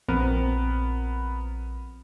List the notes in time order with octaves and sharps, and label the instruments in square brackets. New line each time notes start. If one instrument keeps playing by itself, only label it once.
[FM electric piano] A#1 [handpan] F3 C4 [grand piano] B3 A#4